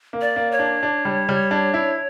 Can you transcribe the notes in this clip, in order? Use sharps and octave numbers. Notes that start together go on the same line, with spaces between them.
A#3
D5
A#3
C#5
D4
D4
G3
G3
D4
E4